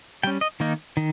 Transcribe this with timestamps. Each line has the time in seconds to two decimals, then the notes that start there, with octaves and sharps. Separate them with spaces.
0.23 G3 C#4 G5
0.41 D#5
0.60 D#3 A#3 D#4
0.97 D#3